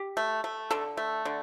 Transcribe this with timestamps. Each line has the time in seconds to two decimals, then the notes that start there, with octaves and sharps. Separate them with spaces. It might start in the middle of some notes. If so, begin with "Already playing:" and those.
Already playing: G4
0.17 A3
0.44 A3
0.71 D3 A4
0.97 A3
1.25 D3